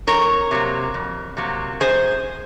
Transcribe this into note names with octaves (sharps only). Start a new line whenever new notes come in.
F2 A#4 C#5
C3 F#3 A#3
F2
C3 F#3 A#3
F#2 G#4 C5